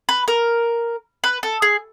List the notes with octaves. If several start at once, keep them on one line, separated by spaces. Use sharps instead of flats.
B4
A#4
B4
A4
G#4